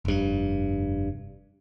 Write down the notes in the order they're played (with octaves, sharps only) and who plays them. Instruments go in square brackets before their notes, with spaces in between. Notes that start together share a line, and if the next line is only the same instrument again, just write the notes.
[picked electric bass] F1 G2